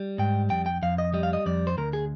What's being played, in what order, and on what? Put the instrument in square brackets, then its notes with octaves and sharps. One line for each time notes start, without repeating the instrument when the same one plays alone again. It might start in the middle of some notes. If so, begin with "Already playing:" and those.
Already playing: [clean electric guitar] G3
G#2 G5
F2 G5
G5
F2 F5
D#5
G3 D#5
F5
D#5
F2 D5
C5
D2 A#4
G#4